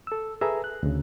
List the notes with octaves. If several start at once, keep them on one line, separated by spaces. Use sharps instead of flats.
A4 E6
G#4 A4 B4 E5 A#5 E6
F#6
D2 C#3